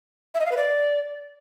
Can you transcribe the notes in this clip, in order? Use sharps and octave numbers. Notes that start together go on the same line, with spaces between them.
E5
D#5
F5
B4
D5